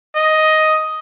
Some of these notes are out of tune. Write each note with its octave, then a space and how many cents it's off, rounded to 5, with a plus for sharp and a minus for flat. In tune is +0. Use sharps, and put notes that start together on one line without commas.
D#5 +5